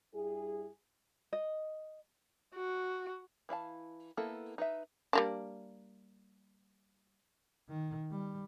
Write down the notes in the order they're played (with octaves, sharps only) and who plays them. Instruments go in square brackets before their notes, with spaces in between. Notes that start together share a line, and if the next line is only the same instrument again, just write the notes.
[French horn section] G2 G3 E4 G#4
[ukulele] D#5
[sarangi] F#4
[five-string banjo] E3 E4 F5 A5
A#3 B3 E4 A4
D#4 B4 E5
[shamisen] G3 A#3 D4
[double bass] D#3
G3